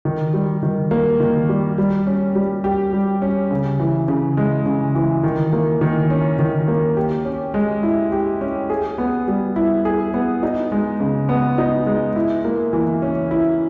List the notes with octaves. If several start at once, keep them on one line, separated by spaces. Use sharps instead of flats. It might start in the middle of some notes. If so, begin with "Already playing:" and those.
D#3
G3
D#3
A#3
D#3
G3
G3
C#4
G3
G4
G3
C#4
C#3
E3
C#3
G#3
C#3
E3
D#3
A#3
D#3
C#4
D#3
A#3
G4
C#4
G#3
E4
G4
C#4
G#4
B3
G3
E4
G#4
B3
D#4
G#3
C#3
B3
D#4
G#3
E4
A#3
E3
C#4
E4